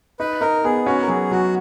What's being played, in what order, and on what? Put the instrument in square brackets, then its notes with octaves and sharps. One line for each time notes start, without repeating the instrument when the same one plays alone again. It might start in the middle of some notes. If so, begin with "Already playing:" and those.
[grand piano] D#4 [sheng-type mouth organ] B4
[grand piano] D#4 [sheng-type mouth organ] A#4
[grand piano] B3 [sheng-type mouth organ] G#4
[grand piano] C#4 [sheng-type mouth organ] F#4
[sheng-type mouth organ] A#4
[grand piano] F#3 [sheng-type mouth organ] G#4
[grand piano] F#3 [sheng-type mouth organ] F#4